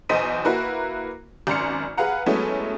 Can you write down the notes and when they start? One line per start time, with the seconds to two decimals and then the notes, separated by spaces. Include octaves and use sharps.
0.09 B1 E2 C5 D#5 B6 D#7
0.45 A#3 E4 F#4 A#4 B4
1.47 G#1 F#2 D5 C6 F6 C#7
1.97 G#4 B4 F5 F#5 A#5
2.26 F#3 G#3 A3 B3 C#4 E4